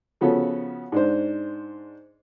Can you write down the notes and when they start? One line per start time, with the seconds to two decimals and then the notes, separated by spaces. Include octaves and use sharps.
0.21 C#3 F3 B3 C#4 F#4 A4
0.92 G#2 D4 C5